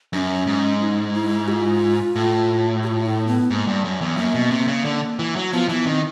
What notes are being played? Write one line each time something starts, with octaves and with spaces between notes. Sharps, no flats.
F#2 D4
C#4
G#2
E4
D#4
E4
G4
F4
A2
G4
F4
E4
B3
G#2 A#3 B3
G2
F#2
E2
F#2 A#3
B2
C3
C#3
D3
E3
F#3
F3 B3
E3 B3
D#3 C4